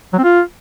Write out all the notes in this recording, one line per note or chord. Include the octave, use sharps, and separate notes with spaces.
F#3
C4
F4